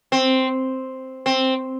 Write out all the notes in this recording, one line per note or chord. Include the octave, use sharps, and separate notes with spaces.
C4
C4